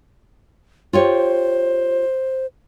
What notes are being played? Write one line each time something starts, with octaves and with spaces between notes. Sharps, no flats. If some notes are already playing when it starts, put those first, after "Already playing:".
F4 G4 C5 C#5